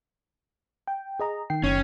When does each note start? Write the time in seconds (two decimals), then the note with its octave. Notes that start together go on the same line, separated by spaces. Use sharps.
0.87 G5
1.20 G#4 D#5 A#5
1.50 D#3 G5 C7
1.64 F#1 C#4